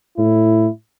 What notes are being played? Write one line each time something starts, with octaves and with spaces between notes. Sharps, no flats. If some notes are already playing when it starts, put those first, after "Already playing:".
A2 E4